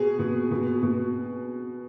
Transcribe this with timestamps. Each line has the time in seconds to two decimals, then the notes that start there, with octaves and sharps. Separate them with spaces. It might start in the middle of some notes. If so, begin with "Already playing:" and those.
Already playing: B2 G#4
0.19 B2
0.51 B2
0.83 B2